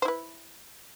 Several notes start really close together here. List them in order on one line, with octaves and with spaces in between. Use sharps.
C5 E4 B4